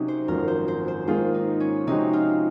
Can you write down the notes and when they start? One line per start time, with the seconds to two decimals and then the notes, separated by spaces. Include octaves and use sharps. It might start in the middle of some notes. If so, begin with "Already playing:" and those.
Already playing: C3 F#3 C#4 D#4 F#4
0.08 C5
0.28 G#1 F#2 F3 A#4
0.48 C5
0.68 C5
0.88 C5
1.07 G#2 D#3 A#3 F4 G#4 C5
1.34 D#4
1.60 C#4
1.87 C3 F3 G#3 C4 D#4 F#4
2.13 F4